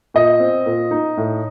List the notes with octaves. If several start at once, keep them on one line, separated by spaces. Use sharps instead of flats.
A#2 D#5
C4
A#2
D#4
A2